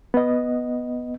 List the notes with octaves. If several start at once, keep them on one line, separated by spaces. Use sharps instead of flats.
B3 D#5